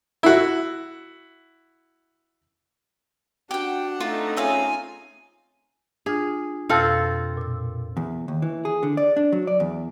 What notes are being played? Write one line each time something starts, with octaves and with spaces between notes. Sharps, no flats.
E4 F#4
D4 F#4 G4 F#5 G5
A3 C4 D#4 F4
C#4 F4 G#4 E5 F5 G#5
D4 F4 G#4
F2 B2 C4 F4 A4
A#2 E6
E2
D#2
E3
G#4
D3
D5
D4
F#3
D5
E2